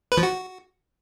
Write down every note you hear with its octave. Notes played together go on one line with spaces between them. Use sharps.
B4
F3
F#4